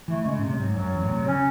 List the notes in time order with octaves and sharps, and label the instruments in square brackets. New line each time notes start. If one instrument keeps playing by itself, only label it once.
[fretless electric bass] E3 [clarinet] A3
[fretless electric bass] C#3 [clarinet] G#3
[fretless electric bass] A2
C3
[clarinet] F#3
[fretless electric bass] G#2
[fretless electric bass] F#2 [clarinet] F#3
[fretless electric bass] E2
A2
C3
[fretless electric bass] C#3 [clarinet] C#4